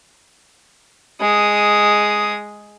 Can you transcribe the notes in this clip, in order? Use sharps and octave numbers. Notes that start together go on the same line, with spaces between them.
G#3 D#6